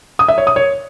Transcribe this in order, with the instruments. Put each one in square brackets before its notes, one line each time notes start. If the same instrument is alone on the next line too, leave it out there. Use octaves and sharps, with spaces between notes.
[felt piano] D#6
E5
C#5
D#6
C#5